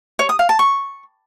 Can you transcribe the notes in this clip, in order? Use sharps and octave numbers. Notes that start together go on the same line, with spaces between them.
C#5
D#6
F5
A5
C#6